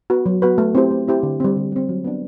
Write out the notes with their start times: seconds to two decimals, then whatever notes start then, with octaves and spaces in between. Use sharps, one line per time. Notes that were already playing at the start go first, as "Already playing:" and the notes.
0.10 B3 F#4 B4
0.26 F#3
0.42 B3 F#4 B4
0.58 A3
0.75 C4 E4 G4 C5
0.91 A3
1.08 C4 E4 G4 C5
1.23 D3
1.40 G3 C4
1.57 D3
1.72 G3 C4
1.89 F#3
2.04 B3 D4